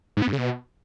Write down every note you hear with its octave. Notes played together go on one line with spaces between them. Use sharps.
G#2
B3
G2
C#3
B2